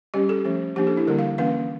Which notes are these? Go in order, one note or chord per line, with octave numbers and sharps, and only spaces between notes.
G3 C#4 G4
A4
F3 A3 C#4
F3 A#3 D4 G4
A4
E4
D3 G3 A#3 A#4
F5
E3 A#3 C#4 F5